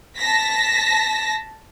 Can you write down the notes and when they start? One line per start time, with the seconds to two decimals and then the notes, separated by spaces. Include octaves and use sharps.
0.17 A5 A#6 B6